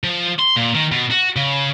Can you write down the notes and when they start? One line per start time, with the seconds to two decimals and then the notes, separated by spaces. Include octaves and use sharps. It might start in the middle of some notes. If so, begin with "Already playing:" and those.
0.04 F3
0.39 C6
0.57 A#2
0.75 D#3
0.92 B2
1.11 F#4
1.36 C#3